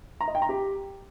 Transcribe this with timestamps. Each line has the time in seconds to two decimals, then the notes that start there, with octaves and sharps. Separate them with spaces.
0.21 A#5
0.28 D#5
0.35 G5
0.42 A#5
0.49 G4